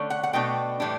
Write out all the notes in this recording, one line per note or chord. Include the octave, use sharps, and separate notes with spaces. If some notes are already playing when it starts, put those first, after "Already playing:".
Already playing: D3 A3 C#4
F#5
F#5
B2 A3 D4 G5
A2 E3 G3 D4